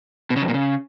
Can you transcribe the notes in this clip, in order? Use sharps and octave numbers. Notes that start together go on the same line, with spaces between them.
B2
C#3
F2
A#2
C#3